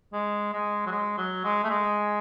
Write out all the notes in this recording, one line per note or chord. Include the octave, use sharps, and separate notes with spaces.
G#3
G#3
F#3
G#3
F#3
G#3
A3
G#3